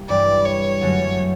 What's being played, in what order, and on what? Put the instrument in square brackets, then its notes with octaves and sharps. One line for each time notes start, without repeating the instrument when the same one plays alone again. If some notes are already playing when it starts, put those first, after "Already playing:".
Already playing: [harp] C2 A#3
[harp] G2 E3 G3 [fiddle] D5
[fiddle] C#5
[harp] F#2 D3 F#3 A3 C#4